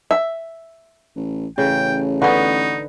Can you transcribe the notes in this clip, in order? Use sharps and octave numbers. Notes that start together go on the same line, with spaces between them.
E5
A1
A1 C#3 G5
D3 B3 D#4 F#4 B4